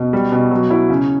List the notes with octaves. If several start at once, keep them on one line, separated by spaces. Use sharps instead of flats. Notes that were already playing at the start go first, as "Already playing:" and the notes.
Already playing: B2
G3
B2
F#3
E4
C#3